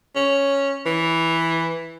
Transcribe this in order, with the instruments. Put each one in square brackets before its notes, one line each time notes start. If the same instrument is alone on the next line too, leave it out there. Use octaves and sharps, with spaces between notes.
[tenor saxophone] C#4
E3